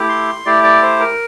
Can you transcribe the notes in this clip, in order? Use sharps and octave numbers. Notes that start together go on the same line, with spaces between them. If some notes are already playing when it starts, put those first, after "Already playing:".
Already playing: A3 E4 G4
C6
A3 E4 G4 D5
D5
C5
A#4